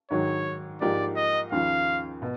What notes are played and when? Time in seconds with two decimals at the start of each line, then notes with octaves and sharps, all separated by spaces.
0.10 G#2 D#3 F#3 C#5
0.81 G#2 F3 A#3 D#4 G4 D5
1.16 D#5
1.52 D#2 C#3 F3 F5
2.22 B2